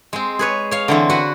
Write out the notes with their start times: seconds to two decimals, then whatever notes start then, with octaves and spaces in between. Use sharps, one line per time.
0.13 G#3 C4
0.39 G#4 B4 C#5
0.71 C#5 F5
0.88 D3 E3 C4
1.10 F#4 B4 F#5